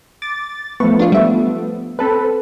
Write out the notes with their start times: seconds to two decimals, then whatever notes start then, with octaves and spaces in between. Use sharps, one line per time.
0.22 D6 A6
0.80 F3 A3 B3 C#6
0.99 D4 F4
1.12 G3 E5
1.99 C4 A4 B4